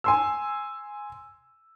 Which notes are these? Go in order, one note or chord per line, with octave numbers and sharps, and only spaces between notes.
G#5 C6 E6